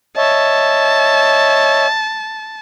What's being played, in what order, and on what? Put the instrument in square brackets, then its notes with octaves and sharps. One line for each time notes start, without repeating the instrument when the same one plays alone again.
[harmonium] C#5 D#5 E5 [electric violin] A5